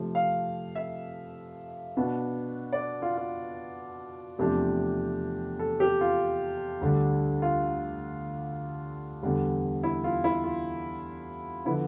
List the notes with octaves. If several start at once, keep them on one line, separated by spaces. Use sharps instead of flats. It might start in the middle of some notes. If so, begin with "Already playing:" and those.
Already playing: C3 F3 A3
F5
E5
B2 B3 D4
D5
F4
F4
E2 C3 F3 A3 D4 G4
A4
G4
F4
D2 D3 G3 D4
F4
E2 D3 G3
E4
F4
E4
F4
D3 F3 B3 E4